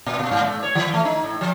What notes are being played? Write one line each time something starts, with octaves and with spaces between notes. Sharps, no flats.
A#2
B2
G#2
A3
C#5
E3
A3
D#4
A2
F3